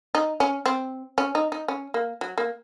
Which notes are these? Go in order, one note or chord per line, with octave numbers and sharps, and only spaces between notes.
D#4
C#4
C4
C#4
D#4
D#4
C#4
A#3
F#3
A#3